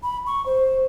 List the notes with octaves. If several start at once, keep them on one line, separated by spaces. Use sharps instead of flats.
B5
C#6
C5